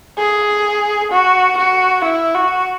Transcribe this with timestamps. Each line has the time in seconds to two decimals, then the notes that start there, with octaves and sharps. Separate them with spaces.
0.18 G#4
1.11 F#4
1.58 F#4
2.04 E4
2.35 F#4